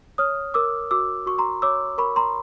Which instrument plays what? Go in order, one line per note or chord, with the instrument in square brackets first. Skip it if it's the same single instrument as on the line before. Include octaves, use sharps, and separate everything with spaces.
[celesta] C#5 D#6 F6
A#4 D6 E6
F#4 D6 E6
F#4 C#6
A#5 C6
C#5 D6 E6
A#4 B5 C#6
A#5 C6